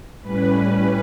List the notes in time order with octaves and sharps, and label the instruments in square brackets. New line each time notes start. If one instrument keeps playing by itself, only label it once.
[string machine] A2 G3 C#4 B4